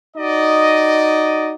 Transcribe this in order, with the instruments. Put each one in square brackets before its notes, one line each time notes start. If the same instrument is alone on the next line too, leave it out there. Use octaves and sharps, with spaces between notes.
[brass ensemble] D#4 F#4 D5 D#5